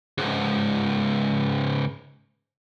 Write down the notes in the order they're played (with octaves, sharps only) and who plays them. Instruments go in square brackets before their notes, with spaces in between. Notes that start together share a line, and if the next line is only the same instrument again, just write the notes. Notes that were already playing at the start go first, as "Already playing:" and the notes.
[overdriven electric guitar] C#2 G#2